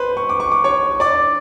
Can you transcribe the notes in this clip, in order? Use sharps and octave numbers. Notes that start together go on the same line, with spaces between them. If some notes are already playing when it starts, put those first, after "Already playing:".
Already playing: B4 C5 B5 C6
C#6
D6
C#6
D6
C#5 C#6
D5 D6